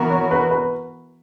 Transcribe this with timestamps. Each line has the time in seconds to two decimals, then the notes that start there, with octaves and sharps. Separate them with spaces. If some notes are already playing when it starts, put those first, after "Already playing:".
Already playing: E3 B3 F#4 A#4
0.10 C#5
0.31 B4
0.51 B4